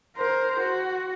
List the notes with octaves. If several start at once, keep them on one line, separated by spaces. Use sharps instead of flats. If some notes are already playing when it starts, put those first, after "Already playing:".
A#4 C5
F#4